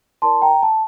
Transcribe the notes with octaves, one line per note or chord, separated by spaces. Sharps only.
E4 A#4 D5 A5 C6
G5 A#5
A5